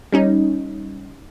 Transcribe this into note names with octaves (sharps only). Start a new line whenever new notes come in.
G3 C#4 D#4